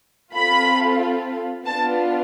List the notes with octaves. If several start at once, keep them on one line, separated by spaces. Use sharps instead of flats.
C4 F4 A4 B5
B3 D4 F4 A5